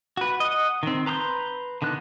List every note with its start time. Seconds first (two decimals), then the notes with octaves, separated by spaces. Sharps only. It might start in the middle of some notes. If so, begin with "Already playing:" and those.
0.17 F#4 B4
0.40 D#5 F#5
0.83 D#3 C4
1.06 B4 A#5 C6 D#6 G6
1.82 D3 D#3 B3 F#6